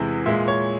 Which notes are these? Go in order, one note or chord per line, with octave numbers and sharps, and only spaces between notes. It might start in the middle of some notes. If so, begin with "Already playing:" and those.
Already playing: E2 C3 E3 G#3
A#2 G#3 E5
C#5